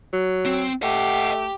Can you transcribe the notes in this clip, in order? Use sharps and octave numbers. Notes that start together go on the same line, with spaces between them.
F#3
C4
A3 G4 D#5 F#5